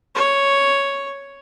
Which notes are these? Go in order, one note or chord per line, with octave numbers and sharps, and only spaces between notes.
C#5